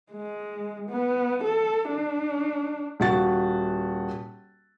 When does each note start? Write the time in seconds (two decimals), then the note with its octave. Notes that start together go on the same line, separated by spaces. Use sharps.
0.12 G#3
0.89 B3
1.44 A4
1.89 D4
3.00 D#1 F#4 A6